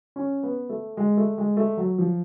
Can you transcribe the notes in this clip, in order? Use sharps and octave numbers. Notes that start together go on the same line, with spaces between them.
C#4
B3
A3
G#3
A3
G#3
A3
F#3
F3